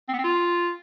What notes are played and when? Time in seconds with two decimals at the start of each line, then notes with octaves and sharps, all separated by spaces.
0.08 C4
0.14 B3
0.19 C4
0.24 F4